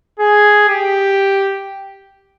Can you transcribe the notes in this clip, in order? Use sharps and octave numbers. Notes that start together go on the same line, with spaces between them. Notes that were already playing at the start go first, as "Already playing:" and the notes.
G#4
G4